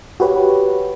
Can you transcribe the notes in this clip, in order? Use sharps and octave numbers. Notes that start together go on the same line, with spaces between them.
F#4 G4 B4 C#5